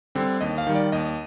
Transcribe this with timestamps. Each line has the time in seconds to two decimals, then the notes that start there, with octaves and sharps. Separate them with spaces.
0.15 D3 G3 C4
0.41 D#2 D#5
0.58 F5
0.67 D#3 G3
0.75 D5
0.92 D#2 D#5